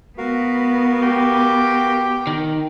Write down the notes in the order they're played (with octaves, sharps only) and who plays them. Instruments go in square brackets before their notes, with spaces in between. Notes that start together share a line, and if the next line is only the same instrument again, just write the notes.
[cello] B3 [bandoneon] F#4 A#4 F5
[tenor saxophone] G4
[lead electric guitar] D#3